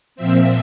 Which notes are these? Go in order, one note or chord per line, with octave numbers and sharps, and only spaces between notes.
A#2 F3 C4 E5